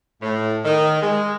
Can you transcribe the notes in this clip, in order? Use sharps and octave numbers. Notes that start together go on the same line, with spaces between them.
A2
D#3
G#3